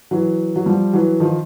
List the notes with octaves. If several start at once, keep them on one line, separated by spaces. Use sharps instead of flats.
E3 F#3
F#3
F3 G3
E3 F#3
D#3 F3